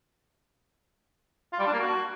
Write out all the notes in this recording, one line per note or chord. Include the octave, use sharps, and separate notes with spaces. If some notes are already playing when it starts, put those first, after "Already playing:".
F4
G3
D4
A#3
F#4